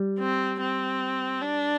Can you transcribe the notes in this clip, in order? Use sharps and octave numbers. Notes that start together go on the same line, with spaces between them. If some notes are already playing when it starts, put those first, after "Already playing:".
Already playing: G3
C4
C4
D4